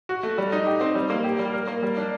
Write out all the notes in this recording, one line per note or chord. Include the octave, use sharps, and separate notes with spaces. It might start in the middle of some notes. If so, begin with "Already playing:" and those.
F#4
A3
G3
D#4
G4
C4
G3
A#3
G4
G3
A#4
A#3
G3
D4